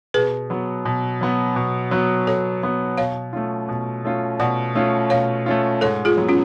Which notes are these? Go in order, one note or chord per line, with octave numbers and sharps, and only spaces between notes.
B2 G#4 B4
F#3 B3
B2
F#3 B3
B2
F#3 B3
B2 A4 C#5
F#3 B3
B2 C#5 F5
A3 C#4 F4
B2
A3 C#4 F4
B2 D5 F#5
A3 C#4 F4
B2 C#5 F5
A3 C#4 F4
G#2 A4 C#5
F4 G#4
F#3 B3
C#4 F4